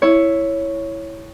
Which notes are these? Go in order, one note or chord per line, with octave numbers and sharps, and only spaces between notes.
E4 C#5